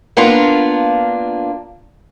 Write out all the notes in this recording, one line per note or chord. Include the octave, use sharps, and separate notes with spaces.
A#3 B3 D4 F4